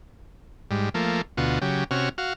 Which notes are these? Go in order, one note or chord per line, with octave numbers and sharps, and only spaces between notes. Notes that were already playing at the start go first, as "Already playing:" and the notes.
G#2 G3
F3 A3 A#3
D2 B2 F4 F#4
C#3 F#3 G4
C3 C#4 F#4 F6
F#4 F5